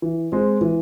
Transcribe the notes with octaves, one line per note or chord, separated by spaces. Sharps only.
E3
G#3 C4
E3